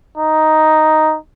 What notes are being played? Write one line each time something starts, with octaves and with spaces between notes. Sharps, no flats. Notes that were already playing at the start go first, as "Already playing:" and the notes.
D#4